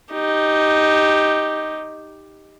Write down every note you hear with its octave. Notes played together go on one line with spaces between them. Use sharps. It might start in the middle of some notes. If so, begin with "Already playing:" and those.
D#4 G4